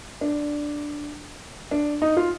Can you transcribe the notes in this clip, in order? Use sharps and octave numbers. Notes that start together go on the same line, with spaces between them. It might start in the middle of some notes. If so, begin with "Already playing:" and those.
D4
D4
D#4
F4